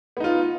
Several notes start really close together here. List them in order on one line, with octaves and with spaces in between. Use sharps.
B3 D#4 F4